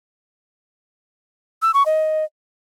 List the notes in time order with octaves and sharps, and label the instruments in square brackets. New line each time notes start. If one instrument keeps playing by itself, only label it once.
[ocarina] E6
C#6
D#5